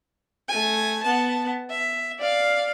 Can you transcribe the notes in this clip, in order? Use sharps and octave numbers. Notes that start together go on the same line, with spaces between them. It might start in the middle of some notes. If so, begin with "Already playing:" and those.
A3 G#5
B3 A5
E5
D5 F5